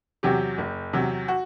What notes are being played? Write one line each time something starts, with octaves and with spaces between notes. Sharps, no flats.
E2 C3 F#3 G4
F#1
E2 C3 F#3
F#4